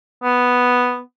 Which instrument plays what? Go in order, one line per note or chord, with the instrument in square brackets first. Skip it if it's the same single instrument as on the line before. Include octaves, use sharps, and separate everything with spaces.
[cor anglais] B3